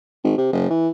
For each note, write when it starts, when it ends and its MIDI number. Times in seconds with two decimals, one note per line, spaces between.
0.24 0.33 32
0.38 0.48 48
0.53 0.68 30
0.70 0.89 52